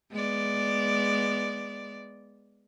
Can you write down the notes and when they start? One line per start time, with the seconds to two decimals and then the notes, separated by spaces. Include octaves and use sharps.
0.12 G#3 B3 D5